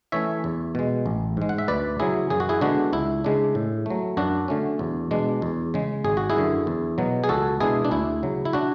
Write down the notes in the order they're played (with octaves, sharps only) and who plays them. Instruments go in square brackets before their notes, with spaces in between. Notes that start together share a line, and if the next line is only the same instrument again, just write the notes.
[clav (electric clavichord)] E3 A3 C#4 C#5 E5
E2
B2 G#3
A1
G#2 G#3
F#5
E5
D2 B4 D5
C#3 F#3 E4 G#4
F#2 G#4
F#4
E4 G#4
D3 G#3 B3 D4 F#4
C#2 E4
C#3 G#3 D4
A2
F#3 A3
F#2 D4 F#4
D3 A3 C#4
E2
B2 G#3 D4
E2
C#3 G#3
G#1 G#4
F#4
E4 G#4
F#2 D3
E2
B2 F#3 B3
G#4
C#2 F#4 A4
B2 G#3 D4 E4 G#4
D4
D2 E4
C#3 F#3
E4
D4 F#4